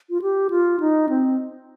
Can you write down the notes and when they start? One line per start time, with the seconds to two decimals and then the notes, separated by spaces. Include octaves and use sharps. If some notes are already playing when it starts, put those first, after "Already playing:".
0.10 F4
0.22 G4
0.50 F4
0.80 D#4
1.09 C4